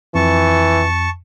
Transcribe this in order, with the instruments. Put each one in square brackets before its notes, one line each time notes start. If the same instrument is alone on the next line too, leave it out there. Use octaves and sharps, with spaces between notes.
[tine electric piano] F2 [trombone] E3 [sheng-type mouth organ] A5 C#6